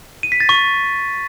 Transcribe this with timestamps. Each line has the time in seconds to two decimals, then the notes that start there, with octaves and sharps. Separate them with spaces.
0.23 D#7
0.32 B6
0.40 A6
0.49 C#6